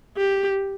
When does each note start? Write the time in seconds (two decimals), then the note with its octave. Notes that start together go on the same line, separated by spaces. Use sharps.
0.17 G4